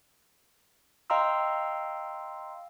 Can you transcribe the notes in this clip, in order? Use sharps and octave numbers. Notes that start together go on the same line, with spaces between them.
D#5 F5 G5 A#5 C6 E6